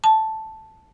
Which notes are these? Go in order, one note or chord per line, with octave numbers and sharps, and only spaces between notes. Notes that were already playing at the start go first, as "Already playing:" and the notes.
A5